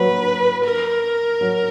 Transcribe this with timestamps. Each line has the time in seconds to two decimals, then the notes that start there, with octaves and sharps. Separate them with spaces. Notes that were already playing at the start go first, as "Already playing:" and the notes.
Already playing: F#3 A#3 B4
0.64 A#4
1.41 F#3